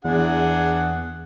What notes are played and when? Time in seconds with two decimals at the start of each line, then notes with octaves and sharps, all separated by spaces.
0.05 E2 D4 G#4 F#5